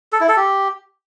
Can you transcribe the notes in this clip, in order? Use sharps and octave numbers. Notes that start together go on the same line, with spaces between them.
A4
E4
A4
G4